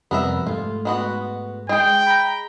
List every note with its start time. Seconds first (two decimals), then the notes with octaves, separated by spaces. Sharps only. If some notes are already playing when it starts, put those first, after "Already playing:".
0.11 F2 C3 G3 B3 A#4 E5
0.47 G#2 A3 F4
0.85 G#3 B3 F#4
1.69 G#3 G#4 G5
2.07 A#5 B5